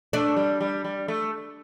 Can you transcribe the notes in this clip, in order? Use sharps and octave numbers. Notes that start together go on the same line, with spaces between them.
A3 D4
G3
G3
G3
A3